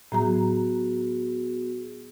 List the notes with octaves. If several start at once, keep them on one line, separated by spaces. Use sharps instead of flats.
A2 F#3 B3 F#4 G#4 A#5